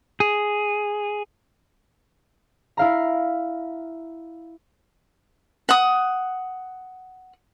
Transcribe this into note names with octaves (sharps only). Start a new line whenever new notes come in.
G#4
E4 F5 A#5
F#5 D#6